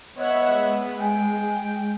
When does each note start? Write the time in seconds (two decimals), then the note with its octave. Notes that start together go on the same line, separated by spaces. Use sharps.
0.17 B3 C#5 D#5 E5 F#5
0.53 G#3
1.00 G5 G#5